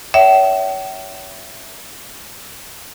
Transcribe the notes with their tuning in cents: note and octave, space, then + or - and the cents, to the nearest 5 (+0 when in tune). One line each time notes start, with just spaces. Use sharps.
C#5 +25 E5 +0 G5 -45